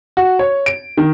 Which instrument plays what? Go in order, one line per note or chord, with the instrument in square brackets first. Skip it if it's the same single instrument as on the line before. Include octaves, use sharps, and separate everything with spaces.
[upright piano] F#4
C#5
D7
D#3